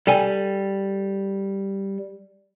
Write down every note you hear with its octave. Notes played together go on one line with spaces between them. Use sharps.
G3 A4 G#5